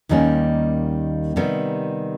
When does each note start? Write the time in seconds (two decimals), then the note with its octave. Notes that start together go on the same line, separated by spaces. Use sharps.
0.09 D#2 D#3 G3 A#3 C#4
1.36 C3 D#3 G3 B3